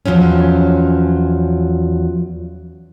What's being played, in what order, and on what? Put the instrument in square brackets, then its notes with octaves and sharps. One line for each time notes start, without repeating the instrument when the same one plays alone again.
[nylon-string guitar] E2 B2 F3 F#3 C#4